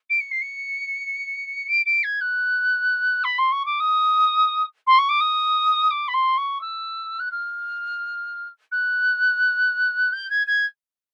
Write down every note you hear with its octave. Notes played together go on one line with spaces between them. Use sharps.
D7
C#7
C7
C#7
D7
D7
G#6
F#6
B5
C6
C#6
D6
D#6
C6
C#6
D6
D#6
D6
B5
C6
C#6
E6
F#6
F6
F#6
G6
G#6
G#6